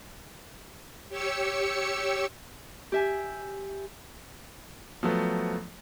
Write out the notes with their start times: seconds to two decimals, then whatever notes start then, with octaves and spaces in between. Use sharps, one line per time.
1.09 G4 C#5 E6 C#7
2.92 G4 E5 G#5
5.03 F3 F#3 A3 B3